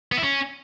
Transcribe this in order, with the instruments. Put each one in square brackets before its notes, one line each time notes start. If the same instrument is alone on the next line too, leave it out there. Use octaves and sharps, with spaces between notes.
[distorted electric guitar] B3
E4
C#4